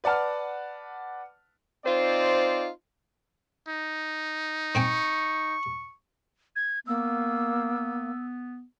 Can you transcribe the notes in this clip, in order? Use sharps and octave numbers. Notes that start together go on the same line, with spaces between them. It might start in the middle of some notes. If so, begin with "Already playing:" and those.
B4 D5 F#5 A5 F6
C4 D#4 F4 C5 D5
D#4
C4 G5 G#5 C#6
G#6
A#3 B3 E6